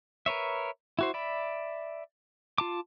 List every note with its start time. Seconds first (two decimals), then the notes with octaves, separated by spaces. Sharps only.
0.26 A#4 B4 C#5 E5
0.99 E4 F#4 C5
1.14 D5 E5 B5
2.58 F4 A5 D6